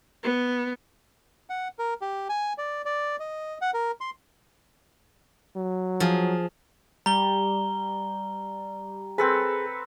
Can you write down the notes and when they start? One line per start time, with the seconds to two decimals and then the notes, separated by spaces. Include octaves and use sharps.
0.23 B3
1.50 F#5
1.79 A#4
2.01 G4
2.29 G#5
2.58 D5
2.85 D5
3.20 D#5
3.61 F#5
3.74 A#4
4.01 C6
5.56 F#3
6.00 F3 G#4
7.06 G3 A#5 G7
9.18 C4 G#4 A4 B4